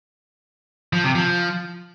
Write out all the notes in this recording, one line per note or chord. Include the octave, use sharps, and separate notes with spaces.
F3
C3
F3